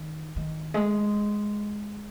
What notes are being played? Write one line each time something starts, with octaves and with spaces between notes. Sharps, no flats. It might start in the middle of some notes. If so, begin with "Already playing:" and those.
Already playing: D#3
D#3
G#3